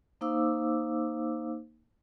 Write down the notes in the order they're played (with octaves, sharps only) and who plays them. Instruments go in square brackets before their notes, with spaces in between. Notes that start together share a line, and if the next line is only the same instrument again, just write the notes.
[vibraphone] A#3 D#4 C5 F5 D6 E6